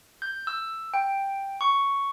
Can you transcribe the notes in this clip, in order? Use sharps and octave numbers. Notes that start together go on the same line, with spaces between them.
G6
E6
G5
C#6